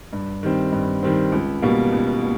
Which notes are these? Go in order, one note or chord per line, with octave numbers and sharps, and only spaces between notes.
G2
D#3 G3 C4
G2
D#3 G3 C4
C#2
B2 G3 A#3
C#2
A#3